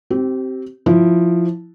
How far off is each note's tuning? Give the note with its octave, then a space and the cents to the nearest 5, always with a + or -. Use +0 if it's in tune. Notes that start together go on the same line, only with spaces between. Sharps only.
C4 +0 G4 -30
F3 +0 E4 +0